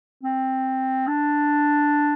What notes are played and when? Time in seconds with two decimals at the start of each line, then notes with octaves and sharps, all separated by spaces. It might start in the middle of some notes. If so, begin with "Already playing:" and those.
0.23 C4
1.07 D4